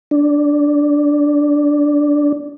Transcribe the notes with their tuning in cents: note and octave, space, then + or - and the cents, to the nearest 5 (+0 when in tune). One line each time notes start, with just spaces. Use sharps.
D4 -5